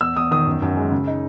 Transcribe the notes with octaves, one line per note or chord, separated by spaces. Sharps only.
E2 E6
E2 D#6
D#3 D#6
F#2
F#2
G#3
C#3
D#4